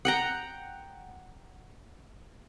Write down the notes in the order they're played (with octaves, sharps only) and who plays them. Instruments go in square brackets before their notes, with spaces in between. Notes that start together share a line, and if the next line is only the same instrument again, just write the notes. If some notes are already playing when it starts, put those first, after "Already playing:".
[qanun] F#5 G5 A#5